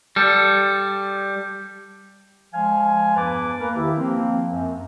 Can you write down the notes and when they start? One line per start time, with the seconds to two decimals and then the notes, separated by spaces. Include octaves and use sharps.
0.16 G3 A4
2.54 F3 G#3 F5 G#5
3.16 E2 G2 B4 G#5 A5 D6
3.60 A#3 A#4 B4
3.76 D#3 E4 G4
3.97 F3 A#3 C4
4.48 F#2